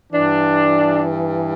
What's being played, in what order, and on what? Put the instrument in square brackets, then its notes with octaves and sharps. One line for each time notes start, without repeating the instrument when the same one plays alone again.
[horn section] G2 E3 D4